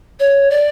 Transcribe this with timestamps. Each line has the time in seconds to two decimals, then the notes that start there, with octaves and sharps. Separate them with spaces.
0.20 C#5
0.50 D5